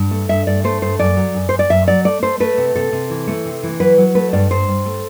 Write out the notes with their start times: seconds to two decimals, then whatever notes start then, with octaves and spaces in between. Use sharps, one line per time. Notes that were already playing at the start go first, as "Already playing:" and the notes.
Already playing: G2
0.11 A3
0.29 G2 E5
0.47 G2 D5
0.64 A3 C5
0.82 G2 C5
0.99 F#2 D5
1.17 F#3
1.34 F#2
1.49 F#2 C5
1.59 D5
1.70 F#2 E5
1.87 F#3 D5
2.05 A3 D5
2.22 A3 C5
2.40 A3 B4
2.57 C3
2.75 C3 A4
2.93 C3
3.10 E3
3.27 A3
3.45 C3
3.63 E3
3.80 F#3 B4
3.98 F#3
4.15 A3 B4
4.33 G2 D5
4.51 G2 C5
4.68 G2
4.86 A3